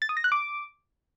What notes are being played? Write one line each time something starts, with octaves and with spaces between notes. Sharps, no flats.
A6
D#6
A#6
F#6
D6